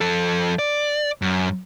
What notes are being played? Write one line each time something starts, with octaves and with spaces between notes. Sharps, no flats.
F3 A4
D5
F#2